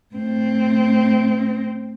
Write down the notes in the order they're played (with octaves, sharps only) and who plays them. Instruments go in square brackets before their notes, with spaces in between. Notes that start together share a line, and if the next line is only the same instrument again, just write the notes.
[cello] A2 C4